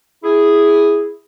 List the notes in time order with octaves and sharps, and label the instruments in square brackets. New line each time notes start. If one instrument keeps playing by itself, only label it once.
[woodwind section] E4 G#4